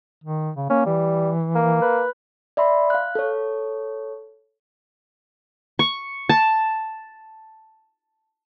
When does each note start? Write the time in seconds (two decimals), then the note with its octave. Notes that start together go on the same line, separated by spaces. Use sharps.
0.24 D#3
0.56 C#3
0.70 A#3 C#4
0.86 E3 G3
1.55 A#3
1.82 B4
2.57 D5 E5 B5 C6
2.90 F5 F#6
3.15 A4 C#5
5.79 C#6
6.29 A5